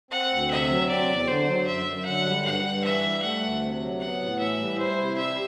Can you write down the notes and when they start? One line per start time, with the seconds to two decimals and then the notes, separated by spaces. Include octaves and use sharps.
0.11 C4 F#5
0.30 D2
0.50 C3 E5
0.69 F#3
0.89 C4 D5
1.08 E2
1.27 D3 C5
1.47 F#3
1.66 F#2 E5
1.86 F#2
2.05 D3 F#5
2.25 G3
2.44 G2 F#5
2.64 G2
2.84 E3 E5
3.03 G3
3.22 A3 F#5
3.41 D2
3.61 C3
3.81 F#3
4.00 B3 F#5
4.20 A2
4.39 E3 E5
4.59 G3
4.78 E4 C5
4.98 C3
5.17 G3 E5